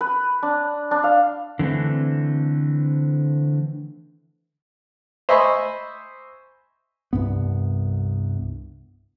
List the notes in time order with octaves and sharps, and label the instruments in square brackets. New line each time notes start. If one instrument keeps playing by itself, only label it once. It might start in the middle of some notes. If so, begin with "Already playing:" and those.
[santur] B4
D4
D4
F5
[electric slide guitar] D3 E3 A3 C4
[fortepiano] C5 D#5 E5 G#5 B5 C#6
[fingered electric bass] C2 G2 B3